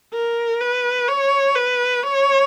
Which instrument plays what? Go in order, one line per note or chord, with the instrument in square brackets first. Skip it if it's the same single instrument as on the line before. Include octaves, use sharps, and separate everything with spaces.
[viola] A#4
B4
C#5
B4
C#5